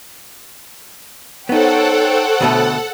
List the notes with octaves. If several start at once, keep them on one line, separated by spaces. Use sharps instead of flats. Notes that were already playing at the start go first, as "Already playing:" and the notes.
B3 D#4 A4 C5 C#5 F#5 G5
D2 B2 A3